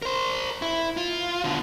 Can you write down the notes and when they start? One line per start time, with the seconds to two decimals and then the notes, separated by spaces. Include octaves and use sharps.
0.02 A#4 C5
0.62 E4
0.97 F4
1.44 B2 D3